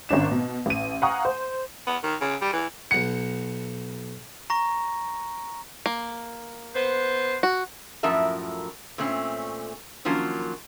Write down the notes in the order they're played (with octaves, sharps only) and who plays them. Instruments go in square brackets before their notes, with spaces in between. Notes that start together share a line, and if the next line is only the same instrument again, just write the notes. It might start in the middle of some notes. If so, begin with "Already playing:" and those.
[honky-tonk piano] G#1 C#4 D4 E7
B2
A1 D#7
F5 F#5 G#5 A#5 C#6 D#6
C5
[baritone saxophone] B3
D#3
C#3
G3
E3
[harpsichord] B1 F#5 [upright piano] C#7
[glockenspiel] A#5 C#6 A#6
[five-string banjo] A#3
[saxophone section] B3 B4 C5
[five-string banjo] F#4
[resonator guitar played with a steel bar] F#2 A2 F3 A#4 E5 A5
A#2 A3 C4 C#4
D#3 F3 F#3 A#3 C#4